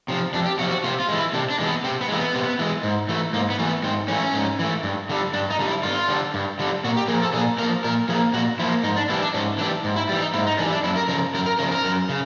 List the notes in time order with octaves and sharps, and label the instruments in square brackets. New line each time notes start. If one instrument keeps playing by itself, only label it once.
[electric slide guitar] C3 F3
F2 D4
G4
C3 F3 F#4
F#4
C3 F4
F4
E3 G#3
E4
C3 D4
D4
E3 G#3
B3
C3 C4
B3
E3 G#3 A#3
B3
C3
E3 G#3
G#2
E3 A3
G#2 A#3
B3
E3 A3
B3
G#2 C4
E3 A3 C#4
G#2
E3 A3
G2
D3 G3
G2 D4
D#4
D3 G3
E4
G2 F4
D3 G3
G2
D3 G3
A#2 F#4
G4
A#3 G#4
F3
A4
A#2 G#4
A#3 A#4
F3
A#2 A#4
F3 A#3 G#4
A#2 F#4
F3 E4
A#3
G#2 D#4
D4
E3 G3 E4
D4
G#2 C#4
E3 G3 D4
G#2
E4
E3 G3
D#4
G#2 E4
D#4
E3 G3 D4
D4
F#2 E4
A#4
C#3 F3 A#4
F#2 A#4
A#4
C#3 F3 A#4
A#4
F#2
C#3